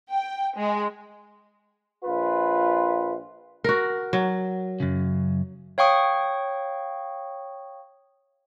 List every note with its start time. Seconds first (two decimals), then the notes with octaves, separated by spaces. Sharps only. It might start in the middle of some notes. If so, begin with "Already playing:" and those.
0.11 G5
0.56 G#3
2.04 A#1 F4 B4
3.64 F#4 A#4
4.13 F#3
4.80 F#2 C#3
5.78 C#5 F5 G5 C#6 D#6